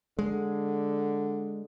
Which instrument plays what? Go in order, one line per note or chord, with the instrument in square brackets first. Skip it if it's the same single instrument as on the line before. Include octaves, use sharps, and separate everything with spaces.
[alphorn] D3 [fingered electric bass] G#3